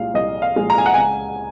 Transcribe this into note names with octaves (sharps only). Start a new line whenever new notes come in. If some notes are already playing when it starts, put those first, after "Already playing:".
Already playing: C2 A#2 F3 G#3 F5
C2 D#5
F5
A#2 F3 G#3
A#5
G#5
F#5
C#2 G#5